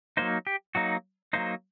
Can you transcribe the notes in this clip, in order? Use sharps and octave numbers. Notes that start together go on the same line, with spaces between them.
F#3 A#3 D#4 C5
G4
F#3 A#3 D#4 F#4
F#3 A#3 D#4 C5